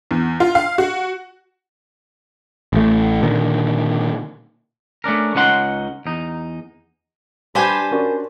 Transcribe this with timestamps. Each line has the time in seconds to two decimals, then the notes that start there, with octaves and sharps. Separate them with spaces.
0.11 E2
0.40 F4
0.55 F5
0.78 F#4
2.73 A1 A3
3.23 A#2 D3 D#3
5.04 A3 C#4 D4 A#4
5.35 C#2 C#4 D#4 F#5 C6
6.06 E2 D#4
7.55 G3 D4 G4 B4 C5 G#5
7.91 C#4 F#4 A#4 D5